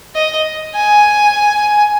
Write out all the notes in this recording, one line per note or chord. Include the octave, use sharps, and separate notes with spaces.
D#5
G#5